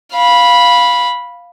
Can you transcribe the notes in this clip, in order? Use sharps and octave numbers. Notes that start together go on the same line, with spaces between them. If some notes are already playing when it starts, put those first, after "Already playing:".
F5 B5